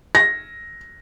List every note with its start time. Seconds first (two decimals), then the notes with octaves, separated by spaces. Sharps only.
0.15 A#6